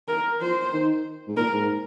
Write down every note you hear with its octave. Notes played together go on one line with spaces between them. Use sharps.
A#4
F3 C5
D#3
G#2
A#2 A#4
G#2